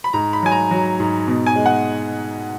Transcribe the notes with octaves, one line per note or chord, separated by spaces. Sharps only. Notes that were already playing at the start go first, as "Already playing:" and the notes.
B5
G#2 A#5
B5
F#3 G#5
A#5
F#3
G#2
B2
G#5
G#3
F#5